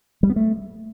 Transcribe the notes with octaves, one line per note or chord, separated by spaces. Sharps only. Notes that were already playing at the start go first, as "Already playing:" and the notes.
G3
B3
A3